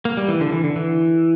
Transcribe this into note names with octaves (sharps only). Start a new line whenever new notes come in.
A#3
G3
E3
D3
E3
D3
E3